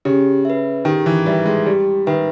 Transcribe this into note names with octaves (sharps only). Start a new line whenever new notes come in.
C#3 G4
B4 E5
D#3 G4
E3
G3 B4 E5
G#3
G3 G4
D#3 B4 E5